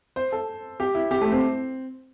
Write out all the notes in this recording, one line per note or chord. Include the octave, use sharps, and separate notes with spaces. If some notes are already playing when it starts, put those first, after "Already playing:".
C5
A4
G4
E4
G4
A3
C4